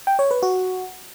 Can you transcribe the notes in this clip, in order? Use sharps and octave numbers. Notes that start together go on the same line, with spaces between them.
G5
C#5
B4
F#4